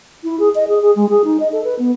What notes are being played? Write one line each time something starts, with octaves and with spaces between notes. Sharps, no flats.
E4
G#4
D#5
G#4
G#4
G#3
G#4
D#4
D#5
A4
B4
B3